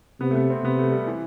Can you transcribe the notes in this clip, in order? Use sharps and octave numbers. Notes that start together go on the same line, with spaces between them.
C3 B3
A3
B3
C4
C3 B3
A3
G3
E3